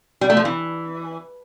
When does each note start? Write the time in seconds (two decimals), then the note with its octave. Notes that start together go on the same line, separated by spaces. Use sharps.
0.21 G3
0.30 A3
0.37 F3
0.45 E3